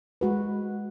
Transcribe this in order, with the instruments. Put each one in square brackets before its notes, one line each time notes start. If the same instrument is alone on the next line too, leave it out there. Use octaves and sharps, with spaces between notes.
[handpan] G#3 F#4 B4